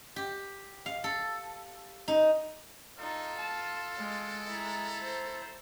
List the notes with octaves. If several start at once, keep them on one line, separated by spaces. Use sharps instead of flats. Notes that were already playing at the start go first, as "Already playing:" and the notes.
G4
F5
A4
D#4
D#4 F4 A4
A5
G#3
E4 A#5
C5